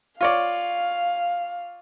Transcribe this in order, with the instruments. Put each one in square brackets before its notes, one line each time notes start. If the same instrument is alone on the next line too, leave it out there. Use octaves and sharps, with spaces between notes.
[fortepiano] F4 C#5 D5 [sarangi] F5